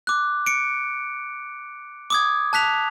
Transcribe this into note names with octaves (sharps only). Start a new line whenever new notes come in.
D6 F#6
C#7 D7
D6 D#6 G#6
A5 F#6 B6 F7